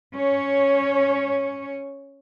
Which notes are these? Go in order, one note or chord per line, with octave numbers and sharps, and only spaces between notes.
C#4 C#5